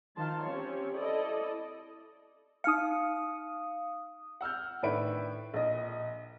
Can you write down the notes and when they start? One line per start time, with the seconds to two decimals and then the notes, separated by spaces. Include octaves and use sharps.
0.18 D#3 F3 F5 A5 C6
0.47 C4 C#4 G4 C#5
0.98 E4 A4 D5 D#5
2.64 D#4 F5 D#6 F6 C#7
4.41 F#5 E6 F6 G6
4.83 A2 D#3 D4 B4 E5 D7
5.54 A#1 D#5